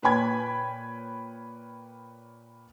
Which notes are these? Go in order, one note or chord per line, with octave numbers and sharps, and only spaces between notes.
A#2 B4 C#5 G5 B5 G#6